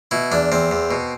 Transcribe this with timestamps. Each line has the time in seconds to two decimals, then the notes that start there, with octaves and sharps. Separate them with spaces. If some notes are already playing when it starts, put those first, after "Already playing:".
0.11 B2 E4
0.32 E2 D4
0.52 E2 C4
0.71 E2
0.91 B2